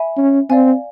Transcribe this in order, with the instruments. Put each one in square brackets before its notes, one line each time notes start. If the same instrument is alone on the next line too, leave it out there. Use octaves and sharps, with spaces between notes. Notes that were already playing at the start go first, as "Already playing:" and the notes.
Already playing: [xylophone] E5 G#5 B5
[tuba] C#4
[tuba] C4 [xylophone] D5 F5 G#5